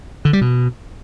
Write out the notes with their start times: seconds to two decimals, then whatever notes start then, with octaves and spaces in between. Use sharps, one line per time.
0.25 D3
0.33 G3
0.41 B2